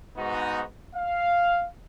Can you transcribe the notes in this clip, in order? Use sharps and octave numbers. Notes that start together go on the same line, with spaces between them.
G#2 B3 D#4 F#4
F5